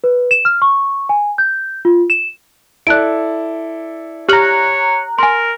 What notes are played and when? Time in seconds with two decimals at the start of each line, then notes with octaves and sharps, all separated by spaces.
0.04 B4
0.31 E7
0.45 F6
0.62 C#6
1.09 G#5
1.38 G6
1.85 F4
2.10 E7
2.87 E4 A4 D5 F#6 D7
4.29 G4 C#5 A#5 F6 F#6 F#7
5.19 A#4 G#5 C6